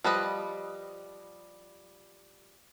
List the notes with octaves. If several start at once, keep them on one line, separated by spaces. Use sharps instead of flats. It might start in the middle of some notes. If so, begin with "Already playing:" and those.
F3 G3 B4 D#5